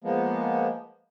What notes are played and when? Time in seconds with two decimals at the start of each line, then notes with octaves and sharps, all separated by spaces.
0.04 F3 G#3 A#3 B3